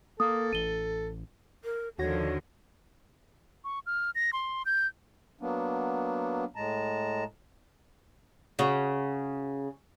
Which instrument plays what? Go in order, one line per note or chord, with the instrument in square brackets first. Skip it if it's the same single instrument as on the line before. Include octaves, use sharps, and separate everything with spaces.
[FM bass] A#3 [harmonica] A4 [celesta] D#6
[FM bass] A1 [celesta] D#7 G7
[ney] A#4
[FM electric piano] D#2 F#4 A#6 [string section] D3 D#3 F3 [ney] C#5
[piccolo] C#6
F6
A#6
C6
G6
[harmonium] F#3 A#3 B3 D4
A2 G#3 A5 A#5
[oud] C#3 F#4